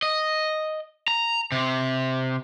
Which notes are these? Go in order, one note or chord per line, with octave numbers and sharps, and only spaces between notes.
D#5
A#5
C3